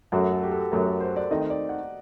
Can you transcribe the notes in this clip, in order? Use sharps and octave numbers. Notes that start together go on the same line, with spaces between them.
F#2 F#3 A3 F#4
A4
G4
A4
F#2 F#3 A3 A#4
A#4
C5
D5
D#3 A3 C4 D#5
D#5
D5
F#5